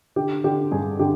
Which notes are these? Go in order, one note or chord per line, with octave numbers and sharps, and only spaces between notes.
D3 G4
D3 G4
G2 G#4
D3 G4